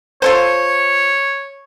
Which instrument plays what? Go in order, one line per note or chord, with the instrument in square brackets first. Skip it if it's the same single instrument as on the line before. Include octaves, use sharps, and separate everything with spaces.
[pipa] F4 A4 C5 [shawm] C#5